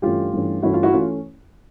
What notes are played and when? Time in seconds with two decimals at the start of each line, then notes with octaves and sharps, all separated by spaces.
0.02 G2 E3 A3 C#4 F4 G4
0.33 G2 E3 A3 C#4
0.62 G2 E3 A3 C#4 E4 F#4
0.74 F4
0.83 E4 F#4
0.93 E3 A3 C#4 F4